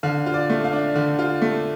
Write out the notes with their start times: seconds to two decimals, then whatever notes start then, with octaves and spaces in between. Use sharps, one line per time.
0.03 D3 F5
0.26 F4
0.34 D5
0.50 A3
0.64 F5
0.73 D4
0.95 D3
1.19 F4
1.42 A3